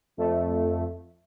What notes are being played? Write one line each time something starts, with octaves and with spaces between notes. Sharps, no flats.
F2 A3